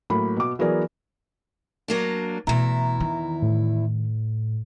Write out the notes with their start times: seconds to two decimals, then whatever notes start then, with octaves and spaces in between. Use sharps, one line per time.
0.10 A2 F#3 A#3 B5
0.37 B2 D6
0.59 E3 F#3 B3 G#4 A#4 D5
1.88 F#3 A#3 D4
2.47 E2 B2 A3 E4 A#5
3.00 D#3
3.42 A2